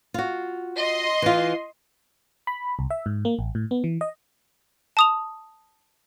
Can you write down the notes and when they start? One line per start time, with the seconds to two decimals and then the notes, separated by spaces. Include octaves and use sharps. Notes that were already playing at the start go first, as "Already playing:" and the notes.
0.14 F4 F#4
0.78 D#5 C6
1.22 E3 F4
2.47 B5
2.79 C2
2.90 E5
3.06 G#2
3.25 A#3
3.39 A1
3.55 A2
3.71 B3
3.84 E3
4.01 D#5
4.97 A5 D#6 F7